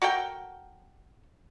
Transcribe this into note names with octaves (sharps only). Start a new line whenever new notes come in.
F#4 A4 A#4 G5